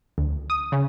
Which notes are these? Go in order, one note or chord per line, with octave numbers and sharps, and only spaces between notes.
D2
D#6
C#3